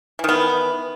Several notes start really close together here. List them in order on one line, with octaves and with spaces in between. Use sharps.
E3 D#3 B3